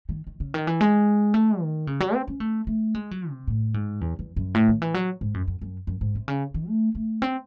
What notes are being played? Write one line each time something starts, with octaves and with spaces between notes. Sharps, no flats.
D#3
D#3
C#3
D#3
E3
G#3
A3
D#3
C#3
F#3
C4
C#4
A3
A3
G#3
F#3
C3
A2
G#2
E2
E2
F#2
A2
D#3
E3
F#3
G#2
F#2
F#2
F#2
F#2
G#2
C3
C#3
D#3
A3
A3
C4